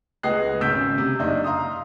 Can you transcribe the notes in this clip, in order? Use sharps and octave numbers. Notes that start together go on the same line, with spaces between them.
C#2 B3 G#4 D#5 F#6 C7
G#1 C#3 E6 G6 B6 D7
C3
F#1 D4 D#4
F5 A#5 C6 D#6